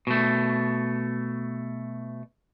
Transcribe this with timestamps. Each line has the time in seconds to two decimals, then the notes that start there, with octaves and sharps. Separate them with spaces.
0.07 B2 A3